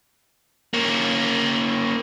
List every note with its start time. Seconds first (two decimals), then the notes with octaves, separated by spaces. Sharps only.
0.74 A#3 C#4